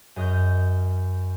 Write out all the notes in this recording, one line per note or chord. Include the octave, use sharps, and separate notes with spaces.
F#2 D#5 F6 G6